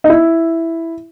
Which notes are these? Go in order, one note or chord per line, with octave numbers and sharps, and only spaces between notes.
D#4
E4